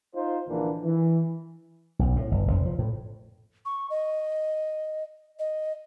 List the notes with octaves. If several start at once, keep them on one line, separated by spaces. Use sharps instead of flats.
D#4 F4 C5
A#1 D3 E3 A#3 D4
E3
B1
A2
G1
F1
F3
A2
C#6
D#5
D#5